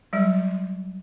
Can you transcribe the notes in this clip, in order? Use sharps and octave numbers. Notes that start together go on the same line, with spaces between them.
F#3 G3